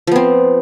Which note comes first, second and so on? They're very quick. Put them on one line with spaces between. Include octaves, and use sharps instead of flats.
F3 B3 C4